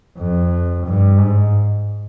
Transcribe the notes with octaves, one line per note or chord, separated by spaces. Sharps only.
F2
G2
G#2